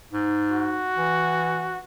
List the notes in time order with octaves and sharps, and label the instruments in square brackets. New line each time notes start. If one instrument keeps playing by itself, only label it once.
[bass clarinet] G#2
[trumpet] F#4
[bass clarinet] E3